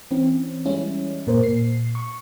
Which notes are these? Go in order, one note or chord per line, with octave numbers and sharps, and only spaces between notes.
E3 C4 C#4
E3 G3 G#3 C#4 E4
A#2 A#4 C5
A#2 C7
C#6